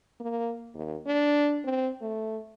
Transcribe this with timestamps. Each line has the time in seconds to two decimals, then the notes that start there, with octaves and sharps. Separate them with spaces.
0.20 A#3
0.74 D#2
1.06 D4
1.65 C4
2.02 A3